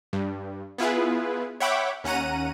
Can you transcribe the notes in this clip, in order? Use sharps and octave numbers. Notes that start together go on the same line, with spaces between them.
G2
B3 E4 F4 G#4 B4
C#5 E5 F#5 G5 B5 D6
D#2 C#4 F#5 A#5 D#7